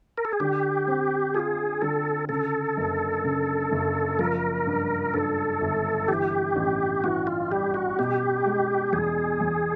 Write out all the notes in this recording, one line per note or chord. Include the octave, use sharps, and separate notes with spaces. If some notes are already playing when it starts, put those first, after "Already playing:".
A#4
A4
G#4
D3 G4
C4
F4 G#4
D3 A4
C#3 A4
F#1
C#3
F#1
F3 A#4
G2
G2 A4
G1
E3 G4
A1
E3 F#4
F4
G3 G4
F#4
B2 G4
G#3
E2 G#4
E2